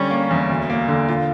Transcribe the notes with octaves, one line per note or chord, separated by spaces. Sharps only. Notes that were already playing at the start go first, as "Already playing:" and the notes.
Already playing: D3 G3 C#4
A#3
E2
D2
A#3
D3
F4